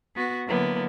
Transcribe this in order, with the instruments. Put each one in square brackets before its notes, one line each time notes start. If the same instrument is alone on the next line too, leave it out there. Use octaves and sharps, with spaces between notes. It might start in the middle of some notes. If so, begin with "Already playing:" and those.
[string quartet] B3 F#4
D3 F#3 A#3 B3 E4